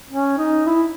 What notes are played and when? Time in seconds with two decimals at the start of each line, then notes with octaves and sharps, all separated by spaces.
0.10 C#4
0.38 D#4
0.66 E4